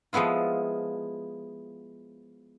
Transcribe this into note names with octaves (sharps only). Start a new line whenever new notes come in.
F3 G#3 B3 E4 F4